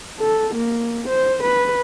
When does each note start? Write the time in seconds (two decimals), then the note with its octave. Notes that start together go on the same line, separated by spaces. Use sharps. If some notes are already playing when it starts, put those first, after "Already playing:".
0.19 A4
0.55 A#3
1.08 C5
1.43 B4